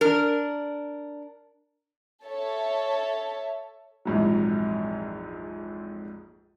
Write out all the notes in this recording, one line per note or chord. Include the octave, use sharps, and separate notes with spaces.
D4 A#4
A4 C#5 E5
A#1 F2 G#2 E3 F#3